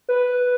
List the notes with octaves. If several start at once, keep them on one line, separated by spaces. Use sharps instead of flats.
B4